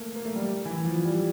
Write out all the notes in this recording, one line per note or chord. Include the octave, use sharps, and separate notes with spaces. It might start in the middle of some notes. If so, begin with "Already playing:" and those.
Already playing: A3 A#3
A#3
A3
G3
E3
F3
G3